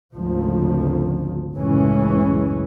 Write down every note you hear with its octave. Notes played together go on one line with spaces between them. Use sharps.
G#1 D2 C#3 F3
F#1 C#2 A2 E3 G#3 C#4